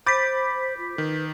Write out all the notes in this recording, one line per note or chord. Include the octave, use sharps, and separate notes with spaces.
C5 B5 D6 G6 A6 B6
F4
D#3 B4